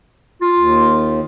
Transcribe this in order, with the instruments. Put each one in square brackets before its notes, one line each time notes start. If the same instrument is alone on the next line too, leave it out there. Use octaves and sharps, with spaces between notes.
[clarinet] F4
[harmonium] D#2